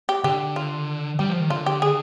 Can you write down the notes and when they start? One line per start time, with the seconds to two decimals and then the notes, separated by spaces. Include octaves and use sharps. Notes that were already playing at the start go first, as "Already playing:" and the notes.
0.09 G4
0.24 D3 G4
0.56 F4
1.19 G3 G4
1.29 F3
1.40 D#3
1.50 D3 F4
1.66 G4
1.82 G#4